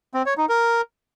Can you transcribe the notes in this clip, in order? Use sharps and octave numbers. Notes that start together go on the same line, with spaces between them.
C4
C#5
D#4
A#4